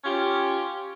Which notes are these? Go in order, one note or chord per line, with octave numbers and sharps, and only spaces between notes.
C#4 F4 G4